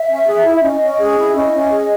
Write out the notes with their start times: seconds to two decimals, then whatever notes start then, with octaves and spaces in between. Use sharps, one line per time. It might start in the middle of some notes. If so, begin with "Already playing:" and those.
Already playing: E5
0.09 C#4
0.28 G#4
0.44 E4
0.62 C#4 D#5
0.81 C#4
0.99 G#4
1.18 E4
1.35 C#4 D#5
1.53 C#4
1.71 G#4